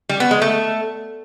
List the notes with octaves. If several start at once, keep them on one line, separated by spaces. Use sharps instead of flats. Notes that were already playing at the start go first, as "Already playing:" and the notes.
G3
B3
G#3
A3